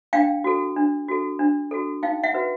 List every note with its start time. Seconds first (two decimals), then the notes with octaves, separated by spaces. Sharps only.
0.13 D4 F5 G5
0.44 F#4 A4
0.77 D4
1.08 F#4 A4
1.39 D4
1.71 F#4 A4
2.03 D#4 F5 G5
2.23 E5 F#5
2.34 F#4 B4